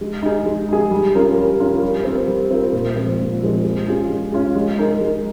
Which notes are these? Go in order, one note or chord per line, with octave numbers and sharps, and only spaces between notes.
G#3
D#4 G#4
G#3
D#4 G#4
G3
C#4 F4 A#4
G3
C#4 F4 A#4
G3
C4 F4 A#4
G3
C4 F4 A#4
A#2
F3 G#3 C4
A#2
F3 G#3 C4
G#3
C#4 F4 G#4
G#3
C#4 F4 G#4
G#3
D#4 A#4
G#3